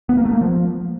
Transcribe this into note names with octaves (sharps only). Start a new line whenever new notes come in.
B3
A#3
A3
A#3
F3